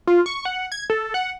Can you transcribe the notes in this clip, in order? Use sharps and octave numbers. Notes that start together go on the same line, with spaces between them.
F4
C#6
F#5
G#6
A4
F#5